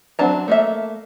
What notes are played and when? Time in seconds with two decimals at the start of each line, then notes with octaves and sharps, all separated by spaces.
0.19 F#3 C4 D4 A5 A#5
0.48 A3 A#3 E5